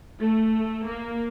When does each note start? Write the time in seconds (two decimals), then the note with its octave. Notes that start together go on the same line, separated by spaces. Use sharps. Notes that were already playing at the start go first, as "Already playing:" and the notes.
0.20 A3
0.85 A#3